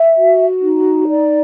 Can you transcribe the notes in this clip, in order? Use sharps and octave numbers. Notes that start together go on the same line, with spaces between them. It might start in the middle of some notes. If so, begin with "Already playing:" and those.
Already playing: E5
F#4
D#4
D5